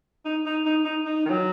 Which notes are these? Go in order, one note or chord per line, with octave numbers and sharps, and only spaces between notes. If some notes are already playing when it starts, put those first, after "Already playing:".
D#4
D#4
D#4
D#4
D#4
D#3
F#3